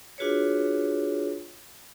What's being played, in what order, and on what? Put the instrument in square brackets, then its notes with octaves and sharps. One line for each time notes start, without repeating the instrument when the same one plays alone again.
[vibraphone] D4 F4 F#4 G#4 B4 C#5